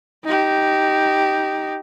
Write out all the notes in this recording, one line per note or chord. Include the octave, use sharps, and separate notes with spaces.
D#4 G4